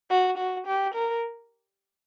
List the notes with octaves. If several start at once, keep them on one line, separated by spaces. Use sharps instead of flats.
F#4
F#4
G4
A#4